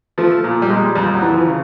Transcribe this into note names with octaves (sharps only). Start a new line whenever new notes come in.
F3 A3
A#2
G3
A#2 G#3
F2 G3
F#3
E3
F3
C#3